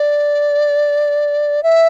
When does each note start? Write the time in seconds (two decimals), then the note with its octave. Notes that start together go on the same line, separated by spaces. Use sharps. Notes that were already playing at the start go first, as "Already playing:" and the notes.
Already playing: D5
1.63 E5